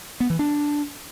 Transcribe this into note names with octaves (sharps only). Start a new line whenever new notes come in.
B3
E3
D4